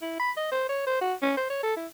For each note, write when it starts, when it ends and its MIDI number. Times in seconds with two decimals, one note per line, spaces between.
0.02 0.15 64
0.19 0.31 83
0.36 0.47 75
0.52 0.67 72
0.69 0.82 73
0.87 1.00 72
1.01 1.14 66
1.22 1.32 61
1.37 1.46 72
1.50 1.61 73
1.63 1.76 69
1.76 1.87 64